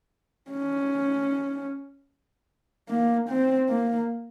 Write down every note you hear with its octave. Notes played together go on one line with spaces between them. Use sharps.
C#4
A#3
C4
A#3